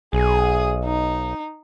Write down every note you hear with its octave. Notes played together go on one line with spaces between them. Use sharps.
B1 G#4 D#6
D#4